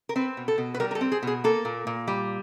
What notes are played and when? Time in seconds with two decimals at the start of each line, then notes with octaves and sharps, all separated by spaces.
0.09 A#4
0.16 C4 B4
0.37 B2
0.48 A4
0.58 B2
0.74 B4
0.80 G3 A#4
0.91 A#4
0.95 A4
1.01 C4
1.12 G#4
1.23 B2 G#4
1.44 A#3 A4
1.65 A#2
1.87 A#2
2.08 G3